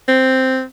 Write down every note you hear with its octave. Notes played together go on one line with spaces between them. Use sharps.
C4